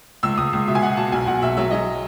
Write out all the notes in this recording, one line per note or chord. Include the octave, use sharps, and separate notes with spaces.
C#2 E6
C#2 D#6
C#2
B2 E5
G#5
B2 F#5
B2 A5
B1 G#5
B1 F#5
B1 E5
F#3 E5
F#3 D#5